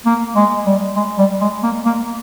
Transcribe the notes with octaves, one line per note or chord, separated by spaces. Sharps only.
A#3
G#3
G3
G#3
G3
G#3
A#3
A#3